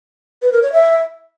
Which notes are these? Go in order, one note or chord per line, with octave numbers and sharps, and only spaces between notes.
B4
A#4
C#5
E5